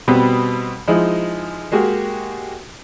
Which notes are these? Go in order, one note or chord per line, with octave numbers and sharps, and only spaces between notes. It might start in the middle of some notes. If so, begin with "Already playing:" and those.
B2 G3 B3 C4
F3 G#3 D#4 E4
G#3 A#3 F#4 G4